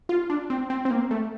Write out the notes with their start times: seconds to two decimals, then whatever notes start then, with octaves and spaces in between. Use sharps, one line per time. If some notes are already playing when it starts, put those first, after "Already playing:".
0.09 F4
0.30 D4
0.50 C4
0.70 C4
0.85 C4
0.90 A#3
1.11 A3